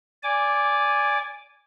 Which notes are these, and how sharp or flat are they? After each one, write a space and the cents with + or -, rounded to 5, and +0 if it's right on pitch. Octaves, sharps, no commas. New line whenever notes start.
D5 -20 G#5 -10 D6 +0